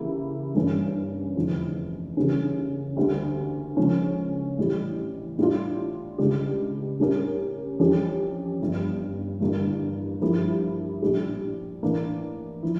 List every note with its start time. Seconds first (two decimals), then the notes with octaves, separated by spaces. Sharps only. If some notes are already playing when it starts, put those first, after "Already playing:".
Already playing: C#3 E3 A#3 E4 G4
0.55 G2 E3 A#3 C#4
1.36 F1 E2 D3 F3
2.17 C#3 E3 G3 A#3 C#4
2.97 D2 D3 G3 A#3
3.77 C#2 C#3 F3 A#3 C#4
4.58 A1 A2 E3 G3
5.38 A1 A2 G3 D4 F4
6.18 C#2 C#3 G3 D4 G4
7.00 A2 G3 C#4 G4 A#4
7.80 F2 E3 G3 C#4 G4
8.60 G1 G2 F3
9.40 A1 G2 D3 G3 A#3
10.21 G2 F3 A#3 E4 G4
11.02 A#1 A2 G3
11.83 A2 E3 A#3 D4
12.63 F3 E4